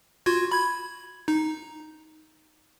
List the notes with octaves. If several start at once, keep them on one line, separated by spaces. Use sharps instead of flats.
F4 F#4 G#6
B5 G#6
D#4